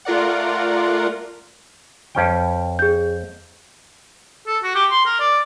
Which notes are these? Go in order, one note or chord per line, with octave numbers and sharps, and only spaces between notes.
A3 F4 A#4 D5 F#5
F2 C#4 G5
G#4 G6
A4
F#4
G4
C6
A#4
D5